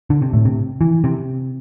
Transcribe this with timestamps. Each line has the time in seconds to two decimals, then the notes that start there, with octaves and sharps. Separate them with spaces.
0.10 D3
0.22 C3
0.33 A2
0.45 C3
0.81 E3
1.04 C3